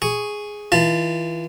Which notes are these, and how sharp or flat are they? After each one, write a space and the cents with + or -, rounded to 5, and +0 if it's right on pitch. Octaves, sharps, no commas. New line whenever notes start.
G#4 +0 C#6 +0
E3 -30 F4 -35 A5 +0